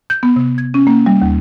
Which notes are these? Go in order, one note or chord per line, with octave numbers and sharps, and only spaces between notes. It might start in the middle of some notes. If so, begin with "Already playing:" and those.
G6
B3
C3
G#6
C#4
A#3
G3
D#2